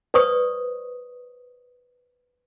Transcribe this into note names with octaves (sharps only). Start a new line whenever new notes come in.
B4 C5 D5 C#6 D#6